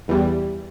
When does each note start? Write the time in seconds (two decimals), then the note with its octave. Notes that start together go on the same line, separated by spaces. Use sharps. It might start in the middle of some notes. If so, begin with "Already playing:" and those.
0.08 E2 E3 G3